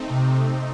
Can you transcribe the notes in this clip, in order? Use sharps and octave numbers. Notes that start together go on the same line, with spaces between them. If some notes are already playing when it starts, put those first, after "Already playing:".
Already playing: A3 C4 D#4
C3